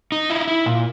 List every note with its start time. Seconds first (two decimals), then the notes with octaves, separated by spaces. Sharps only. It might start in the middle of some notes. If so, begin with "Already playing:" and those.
0.12 D#4
0.30 E4
0.48 E4
0.66 A#2